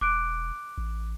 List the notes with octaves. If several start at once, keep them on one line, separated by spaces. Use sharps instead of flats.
E1 D6 F#6 D7
A1